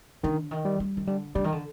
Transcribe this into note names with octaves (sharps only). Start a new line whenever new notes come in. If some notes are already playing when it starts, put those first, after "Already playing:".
D3 D#3
D#3
G3
G3
D#3
D3 G3
D3 G3
D#3
D3